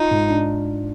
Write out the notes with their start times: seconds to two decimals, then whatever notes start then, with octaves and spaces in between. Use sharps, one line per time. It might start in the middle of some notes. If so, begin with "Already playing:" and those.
Already playing: D#4 F4
0.11 G#2
0.30 D4